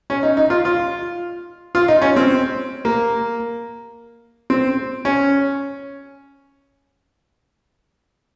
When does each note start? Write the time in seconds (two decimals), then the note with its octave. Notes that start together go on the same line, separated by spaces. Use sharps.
0.10 C#4
0.23 D#4
0.37 D#4
0.50 F4
0.65 F4
1.75 F4
1.88 D#4
2.02 C#4
2.16 C4
2.85 A#3
4.50 C4
5.05 C#4